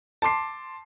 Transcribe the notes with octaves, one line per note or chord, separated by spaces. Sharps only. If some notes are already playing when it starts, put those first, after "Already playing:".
A5 C6 D6 C7